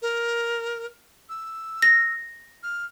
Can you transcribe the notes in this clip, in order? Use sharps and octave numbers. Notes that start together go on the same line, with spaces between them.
A#4
E6
A#6
F6